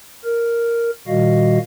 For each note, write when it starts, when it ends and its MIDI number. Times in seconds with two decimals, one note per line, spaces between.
0.24 0.90 70
1.08 1.58 46
1.08 1.58 51
1.08 1.58 55
1.08 1.58 66
1.08 1.58 75
1.08 1.58 77